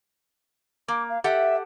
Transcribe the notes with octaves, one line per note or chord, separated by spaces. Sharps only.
A#3 D6
F5
G4 A4 E5 F#5